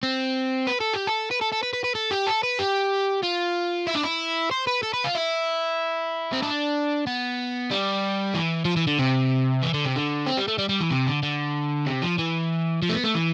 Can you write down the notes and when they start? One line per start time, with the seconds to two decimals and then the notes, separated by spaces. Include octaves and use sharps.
0.03 C4
0.67 B4
0.81 A4
0.94 G4
1.07 A4
1.31 B4
1.42 A4
1.53 A4
1.63 B4
1.74 B4
1.84 B4
1.95 A4
2.11 G4
2.27 A4
2.43 B4
2.59 G4
3.23 F4
3.87 E4
3.95 D4
4.04 E4
4.51 C5
4.67 B4
4.83 A4
4.93 B4
5.04 F4
5.15 E4
6.33 C4
6.43 D4
7.07 B3
7.71 G3
8.35 E3
8.65 F3
8.76 E3
8.87 D3
8.99 C3
9.63 E3
9.74 D3
9.85 C3
9.96 D3
10.27 C4
10.38 G3
10.48 A3
10.59 G3
10.69 G3
10.80 E3
10.91 C3
11.07 D3
11.23 D3
11.87 C3
12.03 F3
12.19 E3
12.82 F3
12.89 A3
12.93 B3
13.04 A3
13.15 E3